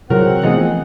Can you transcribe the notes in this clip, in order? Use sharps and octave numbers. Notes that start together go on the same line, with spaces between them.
C3 F#3 C4 F#4 G#4 A#4 F#5
E3 F3 A3 B3 D#4 G#4